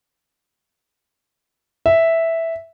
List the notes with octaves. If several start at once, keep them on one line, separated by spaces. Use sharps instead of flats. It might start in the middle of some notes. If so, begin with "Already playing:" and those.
E5